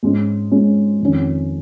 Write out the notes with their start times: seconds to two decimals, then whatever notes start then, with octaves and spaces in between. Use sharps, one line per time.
0.03 G#2 G#3 C#4
0.52 G#2 G#3 C#4
1.01 F2 D#3 C#4